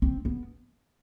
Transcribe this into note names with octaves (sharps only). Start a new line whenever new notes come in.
C4
B3